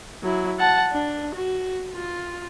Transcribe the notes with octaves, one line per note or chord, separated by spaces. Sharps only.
F#3 E4
F#5 A5
D4
F#4
F4